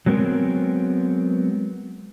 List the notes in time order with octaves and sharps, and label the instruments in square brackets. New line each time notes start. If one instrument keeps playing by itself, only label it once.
[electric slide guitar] F#3 G#3 B3 C4 A#4